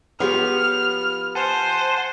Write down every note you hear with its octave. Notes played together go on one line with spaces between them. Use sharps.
F3 B3 G4 G#4 C#5 F6
C5 F#5 G#5 A5